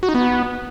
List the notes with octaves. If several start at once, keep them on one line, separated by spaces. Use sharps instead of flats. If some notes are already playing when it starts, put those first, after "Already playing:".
F#4
D#4
B3